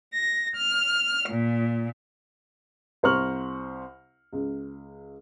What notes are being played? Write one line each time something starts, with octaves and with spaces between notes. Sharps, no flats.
A#6
F6
A#2
C2 C5 A#5 C#6 F6 F#7
C#2